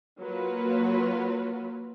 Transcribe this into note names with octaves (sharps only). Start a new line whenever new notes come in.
F#3 A#3 F4 B4